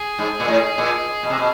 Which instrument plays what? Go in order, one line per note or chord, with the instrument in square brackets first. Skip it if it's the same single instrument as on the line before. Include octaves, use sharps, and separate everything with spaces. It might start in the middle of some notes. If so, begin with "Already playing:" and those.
Already playing: [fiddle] G#4
[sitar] G#2
A#2
A2
A#2
B2
C3
B2